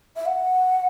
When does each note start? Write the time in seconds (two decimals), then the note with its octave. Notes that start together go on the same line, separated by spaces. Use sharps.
0.16 E5
0.26 F#5